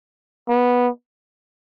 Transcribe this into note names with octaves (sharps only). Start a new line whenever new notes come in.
B3